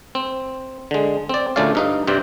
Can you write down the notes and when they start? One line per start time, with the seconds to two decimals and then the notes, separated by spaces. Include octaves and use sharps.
0.15 C4
0.91 D3 G#3
1.29 C4 D5
1.56 D2 A#2 A3 C#4 D5 F5
1.75 G2 D#4 F5
2.07 G2 C3 C4 D5 G5